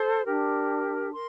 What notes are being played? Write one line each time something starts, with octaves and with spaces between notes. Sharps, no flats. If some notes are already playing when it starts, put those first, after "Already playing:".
Already playing: A4 C5
D4 G4 A#4
A#4 C6